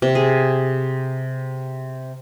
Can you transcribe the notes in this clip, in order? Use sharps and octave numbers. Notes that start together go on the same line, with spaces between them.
C3
G#4